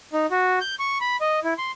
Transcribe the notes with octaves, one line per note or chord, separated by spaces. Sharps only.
D#4
F#4
G6
C#6
B5
D#5
E4
C6